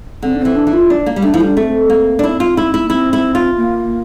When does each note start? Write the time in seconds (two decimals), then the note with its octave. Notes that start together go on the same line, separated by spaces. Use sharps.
0.23 D3 C4
0.35 D4
0.39 C4
0.45 E3
0.56 D4
0.67 E3
0.73 F4
0.90 D4
1.06 A#3
1.16 G3
1.22 A3 D4
1.34 F3 E4
1.40 G3 D4
1.57 A3 C4
1.90 A#3
2.19 D4
2.24 C4 E4
2.40 F4
2.57 E4
2.74 E4
2.83 A#3
2.90 C4 E4
3.13 E4
3.35 F4
3.57 A#3